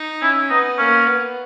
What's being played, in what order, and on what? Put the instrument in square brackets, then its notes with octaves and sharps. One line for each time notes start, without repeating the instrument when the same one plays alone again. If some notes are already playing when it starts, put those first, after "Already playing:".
Already playing: [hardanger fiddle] D#4
[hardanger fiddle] C#4 [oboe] E4
[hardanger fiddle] B3 [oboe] D#4
[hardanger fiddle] A#3 [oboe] C#4
[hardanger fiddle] B3